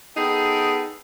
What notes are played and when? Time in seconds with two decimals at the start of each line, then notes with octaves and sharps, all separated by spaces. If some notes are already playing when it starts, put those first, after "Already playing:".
0.16 B3 D#4 G#4 A4 G5